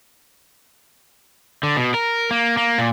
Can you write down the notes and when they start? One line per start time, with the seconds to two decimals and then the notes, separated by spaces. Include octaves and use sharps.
1.63 D3
1.77 B2
1.94 A#4
2.31 A#3
2.57 A#3
2.78 A#2